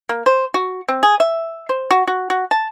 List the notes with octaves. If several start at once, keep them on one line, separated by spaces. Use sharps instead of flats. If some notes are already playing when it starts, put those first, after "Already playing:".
A#3
C5
F#4
C4
G#4
E5
C5
F#4
F#4
F#4
A5